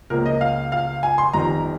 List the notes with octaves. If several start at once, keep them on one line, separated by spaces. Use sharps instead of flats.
C#2 C#3 F3 A#3 A#4
D#5
F5
F5
G#5
C6
G1 F2 D#3 A#5